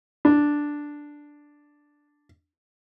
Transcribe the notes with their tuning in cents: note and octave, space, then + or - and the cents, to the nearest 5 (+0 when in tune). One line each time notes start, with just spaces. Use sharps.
D4 +0